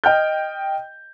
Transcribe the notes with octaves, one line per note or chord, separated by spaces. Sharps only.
D#5 G5 F6 G6